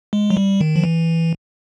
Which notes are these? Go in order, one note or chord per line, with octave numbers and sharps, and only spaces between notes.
G#3
F#3
G3
D#3
F3
E3